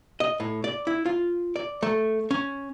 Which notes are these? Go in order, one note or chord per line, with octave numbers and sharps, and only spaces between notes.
D#5
A2
D5
E4
F4
D5
A3
C#4